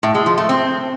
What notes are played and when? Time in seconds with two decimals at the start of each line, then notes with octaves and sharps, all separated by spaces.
0.03 A2
0.15 G#3
0.26 F3
0.38 A3
0.49 C4